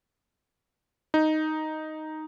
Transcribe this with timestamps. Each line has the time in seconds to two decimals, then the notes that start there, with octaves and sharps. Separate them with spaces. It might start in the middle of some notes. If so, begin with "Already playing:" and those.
1.14 D#4